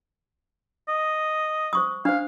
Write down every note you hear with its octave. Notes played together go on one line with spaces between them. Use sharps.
D#5
C5 C#6 D#6
D4 C5 F5